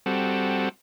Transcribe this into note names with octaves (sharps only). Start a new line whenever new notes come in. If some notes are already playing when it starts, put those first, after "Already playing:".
G3 C4 F#4 A4